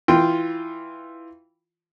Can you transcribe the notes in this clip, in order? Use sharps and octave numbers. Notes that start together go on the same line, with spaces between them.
E3 F4 G5